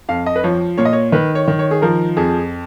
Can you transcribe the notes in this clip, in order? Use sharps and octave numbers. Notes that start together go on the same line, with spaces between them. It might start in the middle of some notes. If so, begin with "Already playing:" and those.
F2 F5
D#5
B4
F3 C#5
A#2 C#5
D#5
C#5
D#3 B4
C#5
D#3
C#5
G#4
F3 A#4
F2 G#4